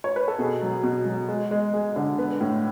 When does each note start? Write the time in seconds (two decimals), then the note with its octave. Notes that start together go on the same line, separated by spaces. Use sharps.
0.04 C#5
0.16 B4
0.28 A4
0.39 B2 G#4
0.62 F#3
0.83 B2
1.05 F#3
1.28 G#3
1.51 G#3
1.74 G#3
1.96 D3
2.18 B3
2.41 A2